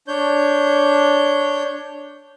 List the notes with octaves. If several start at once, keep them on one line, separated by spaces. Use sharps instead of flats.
D4 C#5 G6